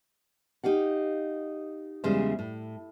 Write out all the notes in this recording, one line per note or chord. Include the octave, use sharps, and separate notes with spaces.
D#4 G4 F5 F#5
E2 C#3 G3 G#3 C5 E5
A2